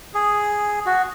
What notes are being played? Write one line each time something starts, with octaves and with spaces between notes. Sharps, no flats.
G#4
F#4